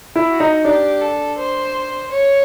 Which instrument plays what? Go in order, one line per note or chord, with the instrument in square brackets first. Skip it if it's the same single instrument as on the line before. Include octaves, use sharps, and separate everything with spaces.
[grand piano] E4
[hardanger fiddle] F#4
[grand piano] D#4
[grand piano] D4 [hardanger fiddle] G4
[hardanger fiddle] A4
C5
C#5